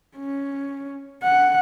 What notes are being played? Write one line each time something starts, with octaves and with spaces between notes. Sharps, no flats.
C#4
F#5